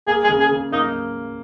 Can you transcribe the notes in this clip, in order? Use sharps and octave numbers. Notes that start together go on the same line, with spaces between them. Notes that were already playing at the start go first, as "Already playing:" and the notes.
A#3 G#4
G#4
C#3
G#4
C#3
A#3 D#4